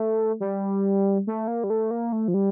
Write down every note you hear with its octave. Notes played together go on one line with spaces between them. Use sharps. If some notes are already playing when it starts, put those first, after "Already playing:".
Already playing: A3
G3
A3
A#3
G3
A3
A#3
A3
F3
G3